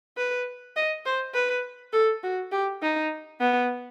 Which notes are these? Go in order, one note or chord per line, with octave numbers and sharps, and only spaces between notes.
B4
D#5
C5
B4
A4
F#4
G4
D#4
B3